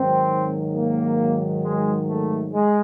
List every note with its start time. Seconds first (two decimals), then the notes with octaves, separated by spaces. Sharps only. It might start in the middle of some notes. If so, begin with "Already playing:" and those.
Already playing: G#2 D#3 F#3 C4
0.76 A#3
1.64 G#3
2.08 A3
2.53 G#3